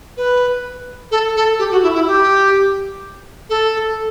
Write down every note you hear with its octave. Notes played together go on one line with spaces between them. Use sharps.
B4
A4
A4
G4
F#4
E4
E4
G4
A4